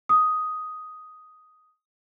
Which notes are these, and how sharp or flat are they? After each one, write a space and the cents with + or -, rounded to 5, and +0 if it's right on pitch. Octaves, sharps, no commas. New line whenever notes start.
D#6 +5